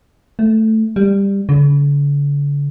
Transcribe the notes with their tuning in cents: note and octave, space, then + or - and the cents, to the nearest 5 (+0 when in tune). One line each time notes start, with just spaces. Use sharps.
A3 +0
G3 +15
D3 -45